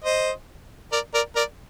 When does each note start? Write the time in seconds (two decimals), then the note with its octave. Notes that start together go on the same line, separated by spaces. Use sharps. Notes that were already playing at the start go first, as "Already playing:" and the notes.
0.04 C5 D#5
0.92 A#4 D5
1.14 A#4 D5
1.36 A#4 D5